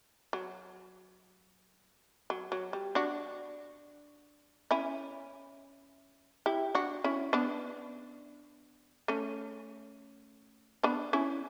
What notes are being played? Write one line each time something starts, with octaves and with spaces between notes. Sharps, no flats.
F#3
F#3
F#3
G3
D4 F#4
C#4 E4
E4 G4
D4 F#4
C#4 E4
B3 D4
A3 C#4
B3 D4
C#4 E4